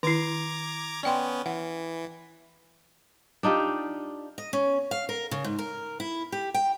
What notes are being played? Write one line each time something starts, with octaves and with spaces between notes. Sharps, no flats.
D#3 E4 A#5 D6 G#6
B3 C#4 D5 G5 C6
E3 F#5
D4 D#4 F4 G4
D#5
C#4
F5
A#4
C#3
G#2
A#4
E4
G4
G5